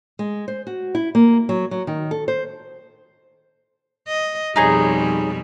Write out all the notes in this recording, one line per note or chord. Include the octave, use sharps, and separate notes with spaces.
G#3
C5
F#4
E4
A#3
F#3
F#3
D#3
A4
C5
D#5
F2 B2 G3 D#4 G#4 C#5